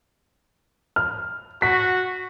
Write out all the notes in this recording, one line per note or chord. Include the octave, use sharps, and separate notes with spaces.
F6
F#4 B6